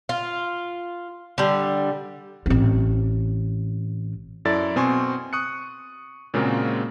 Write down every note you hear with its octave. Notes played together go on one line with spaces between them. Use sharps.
F4
D3 G3
A1 C4
F#2 E4 A4 D5 A6
B2 C4 G#5 C6 C#6
C#6 D#6 F#6 C#7
A#2 C#3 G#3 A#3 C4 F#4